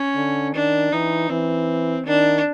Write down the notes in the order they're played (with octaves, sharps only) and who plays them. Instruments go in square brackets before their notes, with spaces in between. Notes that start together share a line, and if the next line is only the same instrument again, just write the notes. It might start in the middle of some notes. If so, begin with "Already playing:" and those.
Already playing: [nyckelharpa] C#4
[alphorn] D3
[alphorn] D#3 [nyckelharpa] D4
[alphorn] E3 [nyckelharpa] D#4
[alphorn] E3 [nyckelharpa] C4
[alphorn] D#3 [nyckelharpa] D4